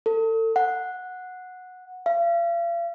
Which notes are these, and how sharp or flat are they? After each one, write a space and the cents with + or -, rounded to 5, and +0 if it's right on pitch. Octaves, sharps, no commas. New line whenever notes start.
A4 +35
F#5 -10
F5 -40